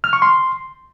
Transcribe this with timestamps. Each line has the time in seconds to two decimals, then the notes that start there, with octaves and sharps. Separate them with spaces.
0.04 F6
0.13 C#6
0.22 C6